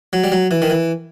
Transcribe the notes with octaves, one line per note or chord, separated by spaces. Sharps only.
F#3
G3
F#3
E3
D#3
E3